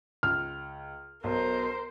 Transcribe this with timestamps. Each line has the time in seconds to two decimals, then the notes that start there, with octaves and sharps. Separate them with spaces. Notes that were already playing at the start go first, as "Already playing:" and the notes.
0.23 C#2 F6
1.24 B1 B2 A#4 C5